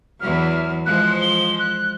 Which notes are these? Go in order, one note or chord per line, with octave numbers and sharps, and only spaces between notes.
E2 E3 F#3 F6
F3 G#3 C5 F#6
G7
F#6